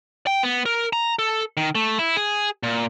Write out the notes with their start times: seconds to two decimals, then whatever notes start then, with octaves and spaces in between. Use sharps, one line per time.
0.27 G5
0.43 B3
0.66 A#4
0.93 A#5
1.19 A4
1.57 D#3
1.75 A3
1.99 E4
2.16 G#4
2.63 A#2